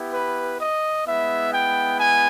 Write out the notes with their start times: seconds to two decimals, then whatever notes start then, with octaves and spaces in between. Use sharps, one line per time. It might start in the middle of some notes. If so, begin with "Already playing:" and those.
Already playing: B3 E4 G4
0.12 B4
0.58 D#5
1.05 G#3 B3 E4 E5
1.52 G5
1.99 G#5